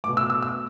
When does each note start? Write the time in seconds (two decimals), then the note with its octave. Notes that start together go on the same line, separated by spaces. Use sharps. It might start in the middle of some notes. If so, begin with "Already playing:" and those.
0.04 A3 D6
0.08 B2
0.17 E6
0.30 E6
0.42 E6